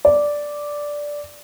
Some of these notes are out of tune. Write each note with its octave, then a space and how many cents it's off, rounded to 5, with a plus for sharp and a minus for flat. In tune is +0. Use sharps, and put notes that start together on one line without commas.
D5 -5